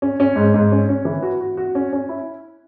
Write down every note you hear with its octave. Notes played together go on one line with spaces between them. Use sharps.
C#4
C#4
G#2
G#2
C#4
C#4
E3
F#4
F#4
F#4
C#4
C#4
E4